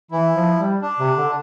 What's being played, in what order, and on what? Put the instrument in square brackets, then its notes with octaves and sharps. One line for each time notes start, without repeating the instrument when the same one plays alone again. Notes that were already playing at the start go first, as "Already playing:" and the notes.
[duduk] E3 [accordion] E4
[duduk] F3
G3
[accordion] D4
[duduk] C3
D3